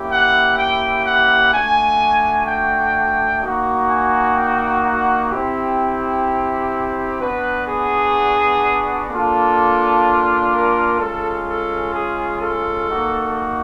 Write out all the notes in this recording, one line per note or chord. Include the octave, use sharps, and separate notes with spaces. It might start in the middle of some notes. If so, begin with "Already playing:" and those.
Already playing: A#3 C#4 E4 G4
F#5
G5
F#5
A3 D4 F#4 G#5
G5
A#3 D#4 F#4
G#5
G5
F#5
C4 E4 G4
B3 D4 F#4 B4
G#4
A#3 D4 F4 A4
A#4
G#3 C#4 F4 A4
A4
G#4
A4
A#3 D#4 F#4